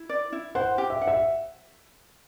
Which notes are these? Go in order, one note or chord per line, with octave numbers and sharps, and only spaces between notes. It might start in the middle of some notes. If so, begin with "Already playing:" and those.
Already playing: E4
D5
E4
C5 F#5
G4
E5
F#5
E5